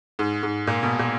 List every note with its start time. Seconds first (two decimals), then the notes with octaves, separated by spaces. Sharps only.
0.19 G#2
0.43 G#2
0.67 A#2
0.83 B2
0.99 A#2